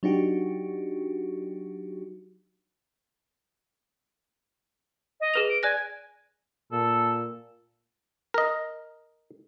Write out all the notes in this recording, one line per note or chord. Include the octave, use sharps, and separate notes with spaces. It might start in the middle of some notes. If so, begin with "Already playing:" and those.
F#3 D4 D#4 F#4 G4
D#5
G#4 B4 F7
D7
D5 G#5 F#6 A#6
A#2 A4
A#4 D#5